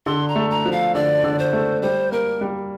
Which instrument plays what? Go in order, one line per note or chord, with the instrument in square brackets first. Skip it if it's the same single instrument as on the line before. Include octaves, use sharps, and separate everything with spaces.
[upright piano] D3 [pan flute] C6
[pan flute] A#5
[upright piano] A3
[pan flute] A#5
[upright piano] F3
[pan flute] F5
[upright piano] D3 [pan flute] D5
[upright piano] D3
[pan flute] C5
[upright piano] A3
[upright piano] G3 [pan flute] C5
[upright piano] A#3 [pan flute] A#4
[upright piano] G3